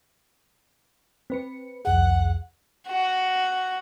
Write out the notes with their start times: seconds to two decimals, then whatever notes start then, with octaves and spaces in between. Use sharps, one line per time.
1.30 C4 B4 C#7
1.85 C2 F2 G#4 F#5
2.88 F#4